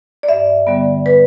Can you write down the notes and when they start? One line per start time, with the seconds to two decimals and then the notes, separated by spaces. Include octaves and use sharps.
0.23 D5
0.29 G2 E5
0.67 D3 G3 B3
1.06 B4